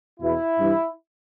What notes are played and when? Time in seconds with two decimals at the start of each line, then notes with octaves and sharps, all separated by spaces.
0.20 E2 B2 E4
0.58 G2 E3